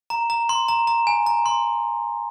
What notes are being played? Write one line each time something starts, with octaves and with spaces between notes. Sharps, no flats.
A#5
A#5
C6
A#5
A#5
G#5
A#5
C6